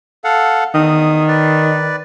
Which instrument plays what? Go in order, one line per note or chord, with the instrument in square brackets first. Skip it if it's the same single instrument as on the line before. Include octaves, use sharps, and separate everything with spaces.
[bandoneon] A4 F5 F#5
[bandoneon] E2 D#6 [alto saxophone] D#3
[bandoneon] B4 D5